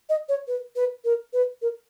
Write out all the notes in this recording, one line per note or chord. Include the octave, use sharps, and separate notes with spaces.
D#5
C#5
B4
B4
A#4
B4
A#4